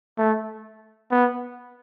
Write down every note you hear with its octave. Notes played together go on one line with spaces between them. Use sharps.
A3
B3